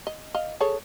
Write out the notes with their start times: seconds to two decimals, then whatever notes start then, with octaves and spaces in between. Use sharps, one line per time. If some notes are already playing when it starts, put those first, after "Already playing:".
0.07 D#5
0.35 D#5 F5
0.60 G#4 A4 C#5